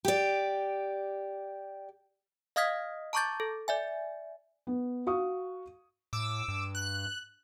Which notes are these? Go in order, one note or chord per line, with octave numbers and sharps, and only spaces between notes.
G4 D5
D#5 F5 D#6 F6 G#6 B6
A5 A#5 C#6 D6 G6 A6
A4
D5 E5 G#5
B3
F#4 F5 C#6 D#6
A2 D6 E6
G2
F#6